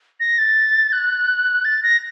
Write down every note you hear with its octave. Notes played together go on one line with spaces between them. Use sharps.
A#6
A6
F#6
A6
A#6